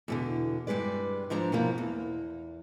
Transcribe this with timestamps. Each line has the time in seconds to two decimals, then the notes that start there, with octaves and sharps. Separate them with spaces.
0.08 E2 B2 D3
0.67 G2 G3 G#3 B4 D5
1.30 G#2 F3 D4 A#5
1.52 B2 E3 F3 A#3
1.78 E2